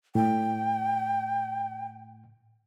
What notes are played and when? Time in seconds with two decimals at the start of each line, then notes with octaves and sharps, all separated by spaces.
0.15 A2 G5